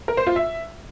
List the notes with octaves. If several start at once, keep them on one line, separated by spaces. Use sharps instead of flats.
A#4
C5
F4
E5